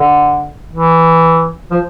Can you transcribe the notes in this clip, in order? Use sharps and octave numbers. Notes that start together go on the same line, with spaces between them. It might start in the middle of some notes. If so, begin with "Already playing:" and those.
Already playing: D3
E3
F3